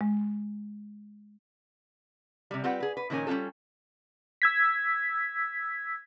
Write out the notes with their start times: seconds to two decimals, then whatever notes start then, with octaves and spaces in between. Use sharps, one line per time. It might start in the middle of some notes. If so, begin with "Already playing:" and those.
0.01 G#3
2.51 C3 G3
2.64 G3 C4 F4 B4 F#5 G5
2.80 G#4 B4
2.97 B4
3.10 A#2 D#3 F3 C#4 A#4 G#5
3.27 G3 C#4 D#4 F4 A4
4.42 E6 G#6 B6